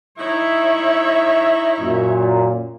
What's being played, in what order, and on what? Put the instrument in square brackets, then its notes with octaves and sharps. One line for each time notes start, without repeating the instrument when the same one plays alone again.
[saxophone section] D#4 E4 [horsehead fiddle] C#5 E5
[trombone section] F#2 A#2